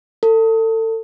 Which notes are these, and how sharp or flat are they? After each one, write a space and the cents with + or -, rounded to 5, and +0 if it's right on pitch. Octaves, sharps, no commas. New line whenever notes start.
A4 +30